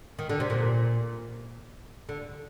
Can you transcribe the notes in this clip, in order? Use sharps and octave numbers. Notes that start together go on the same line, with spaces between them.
D#3
D3
C3
A#2
D3